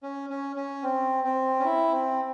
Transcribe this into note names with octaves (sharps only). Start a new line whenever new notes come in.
C#4
C#4
C#4
C4
C4
C#4
E4
C4